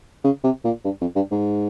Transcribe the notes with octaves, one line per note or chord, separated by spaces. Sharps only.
C#3
C3
A#2
G2
F2
G2
G#2